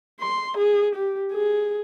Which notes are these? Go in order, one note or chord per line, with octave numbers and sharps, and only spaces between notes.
C6
G#4
G4
G#4